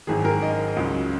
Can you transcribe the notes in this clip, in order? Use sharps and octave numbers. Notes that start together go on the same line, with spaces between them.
G#1 F#2 D#3 G#4
A#4
D#5
C#2 C#3 F#3